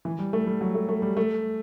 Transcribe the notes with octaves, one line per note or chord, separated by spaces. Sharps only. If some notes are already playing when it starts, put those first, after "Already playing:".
E3
G3
A3
G3
F#3
A3
A3
G3
A3